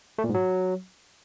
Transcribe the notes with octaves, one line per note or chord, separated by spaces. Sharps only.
A3
A#2
G#2
F#3